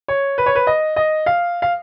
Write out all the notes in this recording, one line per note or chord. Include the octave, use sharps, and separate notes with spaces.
C#5
B4
C#5
B4
D#5
D#5
F5
F5